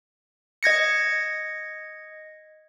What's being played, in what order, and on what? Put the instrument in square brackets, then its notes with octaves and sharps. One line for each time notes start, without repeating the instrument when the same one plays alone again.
[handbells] D#5 G#6 A#6 C#7